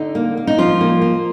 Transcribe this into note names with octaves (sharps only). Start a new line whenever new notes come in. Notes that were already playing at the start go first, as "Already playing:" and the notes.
Already playing: D3 D#4
A#3
A#3
D#4
F3 F4
A#3
A#3